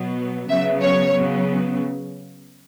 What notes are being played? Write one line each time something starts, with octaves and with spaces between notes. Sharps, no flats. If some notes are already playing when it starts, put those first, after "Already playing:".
Already playing: B2 F#3 B3
C#3 F#3 B3 E5
C#5
C#3 F#3 B3